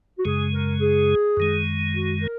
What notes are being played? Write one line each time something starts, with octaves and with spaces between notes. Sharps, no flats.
F#4
F#2 C#3 G#3 G#4
A#4
G#4
F#2 D#3 G#3
F#4
A#4